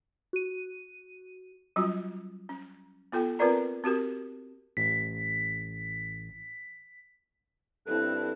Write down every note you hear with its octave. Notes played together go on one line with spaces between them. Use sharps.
F#4 D#7
F#3 G3 C#4 F4 F#4
C#4
B3 F4 A4 G5
C4 F4 A#4 B4 D5 A#5
C4 F#4 G4 A#4
A1 B6
G2 C4 E4 A4 F#6